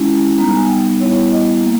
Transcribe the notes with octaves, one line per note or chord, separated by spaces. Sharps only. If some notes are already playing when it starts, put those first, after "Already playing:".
Already playing: G#3 C#4 E4
G3 B3 D#4 A#5
G#5
G5
G3 B3 E4 C#5
D#5
A#3